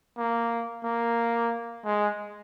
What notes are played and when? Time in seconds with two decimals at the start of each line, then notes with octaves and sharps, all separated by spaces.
0.18 A#3
0.84 A#3
1.84 G#3